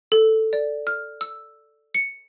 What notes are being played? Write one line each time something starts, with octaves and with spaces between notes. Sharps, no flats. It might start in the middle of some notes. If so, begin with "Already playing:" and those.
A4
D5
F6
E6
C#7